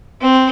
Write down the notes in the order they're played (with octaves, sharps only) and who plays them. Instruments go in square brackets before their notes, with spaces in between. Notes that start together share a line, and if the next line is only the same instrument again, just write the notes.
[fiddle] C4